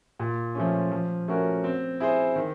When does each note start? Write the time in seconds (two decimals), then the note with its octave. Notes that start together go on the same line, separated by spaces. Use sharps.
0.20 A#2
0.55 F3 A3 C#4
0.92 F3
1.28 A3 C#4 F#4 A#4
1.64 C4
2.00 E4 G#4 C5
2.36 D#3